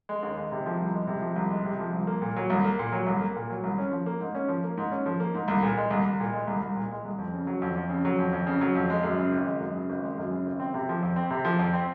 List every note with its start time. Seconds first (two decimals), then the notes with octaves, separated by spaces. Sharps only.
0.09 G#3
0.23 D#2
0.38 G#3
0.52 C3
0.66 F3
0.80 C2
0.94 G#3
1.07 C3
1.22 F3
1.36 C2
1.51 G#3
1.65 C3
1.79 F3
1.93 C2
2.07 A#3
2.22 A#2
2.36 F#3
2.50 C2
2.64 A#3
2.79 A#2
2.92 F#3
3.06 C2
3.21 A#3
3.36 A#2
3.50 F#3
3.64 C2
3.78 C#4
3.92 F3
4.06 A#3
4.20 G#2
4.35 C#4
4.48 F3
4.64 A#3
4.77 G#2
4.92 C#4
5.06 F3
5.20 A#3
5.34 G#2
5.48 C2
5.63 A#2
5.77 G#3
5.90 C2
6.05 C2
6.20 A#2
6.33 G#3
6.47 C2
6.62 C2
6.76 A#2
6.91 G#3
7.05 C2
7.18 F2
7.33 C#3
7.47 F#3
7.62 F2
7.76 F2
7.89 C#3
8.05 F#3
8.19 F2
8.33 F2
8.47 C#3
8.61 F#3
8.75 F2
8.90 G#3
9.03 F#2
9.17 C#3
9.32 G#1
9.46 G#3
9.60 F#2
9.74 C#3
9.89 G#1
10.03 G#3
10.18 F#2
10.31 C#3
10.46 G#1
10.60 C4
10.74 C3
10.89 F3
11.02 F2
11.16 C4
11.30 C3
11.45 F3
11.59 F2
11.73 C4